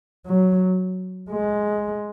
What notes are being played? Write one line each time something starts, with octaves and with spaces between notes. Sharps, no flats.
F#3
G#3